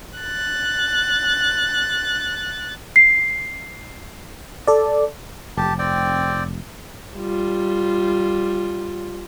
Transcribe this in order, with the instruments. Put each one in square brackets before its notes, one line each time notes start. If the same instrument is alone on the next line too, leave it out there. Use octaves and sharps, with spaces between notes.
[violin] F#6 A6
[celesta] C7
[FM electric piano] A4 D5
[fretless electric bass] F1 [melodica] G4 A5
[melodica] C4 D5 G5
[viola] G3 F4